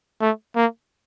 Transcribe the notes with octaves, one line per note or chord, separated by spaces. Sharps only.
A3
A#3